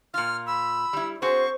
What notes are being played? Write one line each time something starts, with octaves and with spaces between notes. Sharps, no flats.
A#2 F4 F6
B5 E6
G3 E4
C4 F#4 G#4 C5 C#6